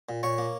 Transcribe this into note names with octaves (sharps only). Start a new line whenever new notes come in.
A#2
A#2 C#5 C#6
A#3